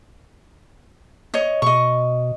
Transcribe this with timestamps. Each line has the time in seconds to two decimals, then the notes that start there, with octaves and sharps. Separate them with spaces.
1.34 C#5 D#5
1.62 B2 D#5 C#6